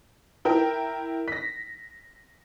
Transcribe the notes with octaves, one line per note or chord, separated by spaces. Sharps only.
E4 A#4 G5
A#6 B6